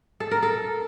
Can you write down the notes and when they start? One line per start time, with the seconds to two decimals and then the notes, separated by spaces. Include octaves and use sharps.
0.20 A4
0.31 A#4
0.42 A4